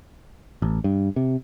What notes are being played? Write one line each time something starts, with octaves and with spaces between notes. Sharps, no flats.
A1
G2
C3